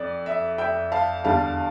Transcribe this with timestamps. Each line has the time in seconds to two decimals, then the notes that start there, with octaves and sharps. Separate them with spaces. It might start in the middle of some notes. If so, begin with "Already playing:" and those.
Already playing: F2 D5
0.26 E5
0.58 E5 G5
0.92 F5 A5
1.24 E2 D3 G3 F5 A5